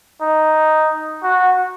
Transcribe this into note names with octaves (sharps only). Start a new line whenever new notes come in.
D#4
F#4